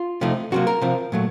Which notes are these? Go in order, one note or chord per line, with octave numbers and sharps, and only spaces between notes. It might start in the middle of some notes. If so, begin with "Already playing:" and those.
Already playing: F4
C3 F3 A3 D#4
C3 F#3 A#3 F#4
A#4
C3 F3 C4
A#2 F#3 A3